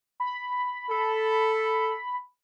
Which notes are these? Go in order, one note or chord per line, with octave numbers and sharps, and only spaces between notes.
B5
A4